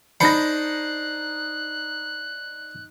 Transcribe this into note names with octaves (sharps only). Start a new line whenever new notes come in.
D4 D#4 C5 B5 C6 F#6 A#6 C#7